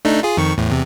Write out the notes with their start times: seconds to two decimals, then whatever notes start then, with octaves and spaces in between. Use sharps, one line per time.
0.05 A3 D4 D#4
0.23 F4 G#4
0.37 F2 D#3 C#6
0.58 E2 A2
0.71 E2 C3